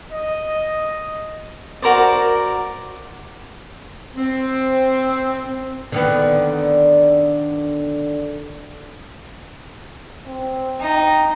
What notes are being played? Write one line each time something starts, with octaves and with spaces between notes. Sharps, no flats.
D#5
F#4 A#4 C5 D5
C4
D3 D#3 B3
C4
D#4 G5